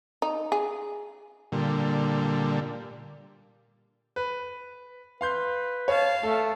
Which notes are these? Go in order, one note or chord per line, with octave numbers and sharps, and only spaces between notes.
D#4
G#4
A#2 D3 G3
B4
B4 F5 C6 G6
C#5 F5 A5
A3 A4